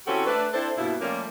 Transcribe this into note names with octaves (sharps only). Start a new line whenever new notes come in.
E3 C4 C#4 F#4 G4 A4
A3 D4 B4
C4 D4 E4 A4 C5
G2 B2 A#3 E4
F3 G3 A3 A#3 C#4 F4